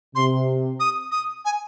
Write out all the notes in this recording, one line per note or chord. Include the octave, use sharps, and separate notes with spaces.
C3 C6
D#6
D#6
G#5